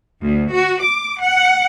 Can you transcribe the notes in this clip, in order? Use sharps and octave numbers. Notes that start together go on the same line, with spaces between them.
D2
F#4
D6
F#5